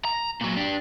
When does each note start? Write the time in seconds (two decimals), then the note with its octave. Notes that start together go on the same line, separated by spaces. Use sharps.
0.05 A#5
0.41 A#2 F#3
0.56 D4 G4